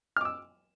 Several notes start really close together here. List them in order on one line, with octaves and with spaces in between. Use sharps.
F6 D6 E6